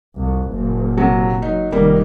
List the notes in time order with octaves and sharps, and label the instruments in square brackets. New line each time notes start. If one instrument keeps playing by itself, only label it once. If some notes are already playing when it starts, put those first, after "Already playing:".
[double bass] C2 F2
F#1 A#2
[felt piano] C3 F#3
[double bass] F#3 [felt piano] D#4
[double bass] F1 D#3 [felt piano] G3 A#3